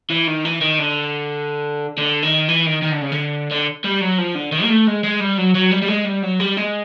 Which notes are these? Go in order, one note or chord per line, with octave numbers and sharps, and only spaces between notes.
E3
D#3
E3
D#3
D3
D3
D#3
E3
D#3
D#3
D3
C#3
D3
D3
G3
F#3
F3
D3
D#3
A#3
A3
G#3
G#3
G3
F#3
F#3
G3
G3
G#3
G3
F#3
G3
G#3